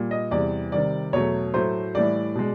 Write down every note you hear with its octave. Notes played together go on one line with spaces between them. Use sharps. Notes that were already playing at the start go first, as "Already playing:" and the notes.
Already playing: A#2 G3
D#5
E2 C3 E3 G3 D5
C3 D#3 G3 D5
E2 B2 F#3 A3 C#5
A2 F#3 A3 C5
A2 E3 G3 D5
B2 G#3